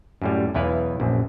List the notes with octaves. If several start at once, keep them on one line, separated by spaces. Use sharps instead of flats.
F#2 A2 G3
B1 E2 E4 B4 F5
A#1 F#2